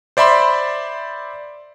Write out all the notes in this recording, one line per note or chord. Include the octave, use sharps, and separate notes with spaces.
C5 D5 E5 B5 C6